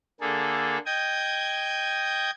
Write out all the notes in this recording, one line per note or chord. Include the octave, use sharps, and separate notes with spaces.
D3 A#3 G#4 A4
D#5 G5 D#6 G6 G#6